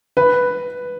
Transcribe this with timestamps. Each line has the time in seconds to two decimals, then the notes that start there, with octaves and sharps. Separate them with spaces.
0.17 B4